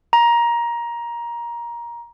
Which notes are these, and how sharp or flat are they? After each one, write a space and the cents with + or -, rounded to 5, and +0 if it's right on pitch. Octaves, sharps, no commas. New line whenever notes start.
A#5 +20